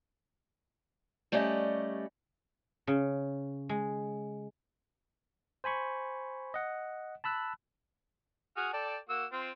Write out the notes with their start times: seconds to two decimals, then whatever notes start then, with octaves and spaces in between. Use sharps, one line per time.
1.32 G3 A3 C#4 G4 D5 D#5
2.87 C#3
3.69 G#3
5.64 C5 G#5 B5 C#6
6.54 D#5 F#5
7.24 A5 B5 E6 F#6
8.57 F#4 G#4 F6
8.73 A4 D5 G5
9.09 A#3 F#4 E6
9.32 C4 F4